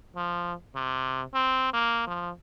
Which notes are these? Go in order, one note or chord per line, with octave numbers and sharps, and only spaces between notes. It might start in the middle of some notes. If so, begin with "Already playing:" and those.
F3
C3
C4
A#3
F3